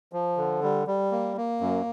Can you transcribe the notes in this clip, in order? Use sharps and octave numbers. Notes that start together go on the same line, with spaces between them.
F3
D3
G3
G3
A#3
A#3
F#2